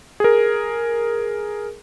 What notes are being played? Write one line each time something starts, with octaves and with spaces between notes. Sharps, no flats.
G#4 A#4